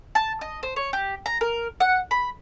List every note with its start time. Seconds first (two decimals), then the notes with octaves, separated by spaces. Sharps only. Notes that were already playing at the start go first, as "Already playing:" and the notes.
0.15 A5
0.41 D#5
0.63 C5
0.76 C#5
0.93 G4
1.26 A#5
1.41 A#4
1.80 F#5
2.11 B5